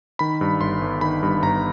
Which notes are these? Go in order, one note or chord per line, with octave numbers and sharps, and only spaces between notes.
D#3 B5
G2
G1 C6
G1
D#3 B5
G2
G1 A#5